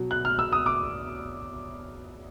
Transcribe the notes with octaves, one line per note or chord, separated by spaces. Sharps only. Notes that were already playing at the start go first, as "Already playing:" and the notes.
Already playing: B2 F#3
F#6
F6
E6
D#6
D6